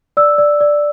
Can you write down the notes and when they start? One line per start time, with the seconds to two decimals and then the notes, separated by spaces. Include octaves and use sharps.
0.17 D5 E6
0.38 D5
0.60 D5